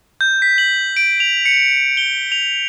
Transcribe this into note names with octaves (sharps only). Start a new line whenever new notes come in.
G6
B6
F#7
D7
F7
C#7
G7
F7